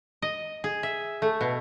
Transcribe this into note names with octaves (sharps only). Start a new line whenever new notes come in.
D#5
G#4
E5
A3
B2